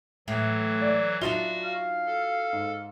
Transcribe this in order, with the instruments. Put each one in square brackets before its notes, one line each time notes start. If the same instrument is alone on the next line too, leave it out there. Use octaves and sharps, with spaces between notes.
[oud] A2 [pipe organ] E3 F#3
[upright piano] D5
[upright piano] F#3 E5 G7 [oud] D4 D#4 F4 [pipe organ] F#4
[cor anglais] F5
[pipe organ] A4
[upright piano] G#2